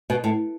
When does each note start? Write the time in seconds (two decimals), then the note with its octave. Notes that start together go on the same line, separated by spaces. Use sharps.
0.10 B2
0.24 A2